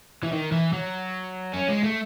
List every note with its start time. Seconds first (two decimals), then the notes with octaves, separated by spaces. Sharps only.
0.23 E3
0.32 D#3
0.52 E3
0.73 F#3
1.53 C#4
1.68 G#3
1.84 A3